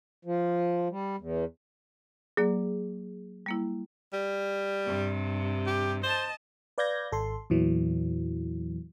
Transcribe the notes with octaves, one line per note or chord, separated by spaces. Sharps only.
F3
G3
E2
F#3 A#3 G#4 D5
G3 A#3 E4
G3
G2 C3
G4
C5 D#5 A5
B4 D5 F5 G6 G#6 A#6
G#1 A4 C6
E2 A#2 E3 F#3